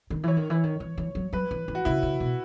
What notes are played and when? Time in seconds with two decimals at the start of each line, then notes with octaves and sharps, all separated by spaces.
0.10 D#3
0.23 E3 C#5
0.37 D#3
0.50 E3
0.63 D#3
0.80 E3
0.98 E3
1.15 F#3
1.33 F#3 B4
1.51 E3
1.68 E3
1.75 F#4
1.85 C#3 E4
2.03 C#3
2.20 B2